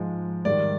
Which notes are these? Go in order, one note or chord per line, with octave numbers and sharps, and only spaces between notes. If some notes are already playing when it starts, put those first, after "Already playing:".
Already playing: G#2 F3 G#3
G#2 D#3 G3 D5